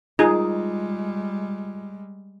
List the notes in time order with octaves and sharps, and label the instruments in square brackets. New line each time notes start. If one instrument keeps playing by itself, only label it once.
[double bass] G3 G#3 [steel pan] D#4 G#4 [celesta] F4